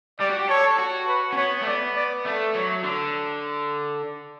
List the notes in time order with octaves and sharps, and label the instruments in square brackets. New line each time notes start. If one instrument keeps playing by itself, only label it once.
[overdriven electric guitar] G3 [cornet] D5
[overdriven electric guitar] F#4
G4
[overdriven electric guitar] A4 [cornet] C#5
[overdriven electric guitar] A4
F#4
[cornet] B4
[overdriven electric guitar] C#4
[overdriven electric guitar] B3 [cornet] C#5
[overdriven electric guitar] A3
[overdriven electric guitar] B3 [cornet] D5
[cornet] D5
[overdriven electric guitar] A3 [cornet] D5
[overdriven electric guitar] F#3 [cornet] C#5
[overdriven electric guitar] D3